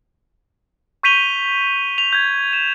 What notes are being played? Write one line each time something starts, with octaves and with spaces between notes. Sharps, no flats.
C#6 G6 B6 D#7 F7 G7
F7
G6 G#6
E7